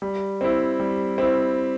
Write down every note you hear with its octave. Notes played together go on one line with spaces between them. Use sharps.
G3
C4 E4
G3
C4 E4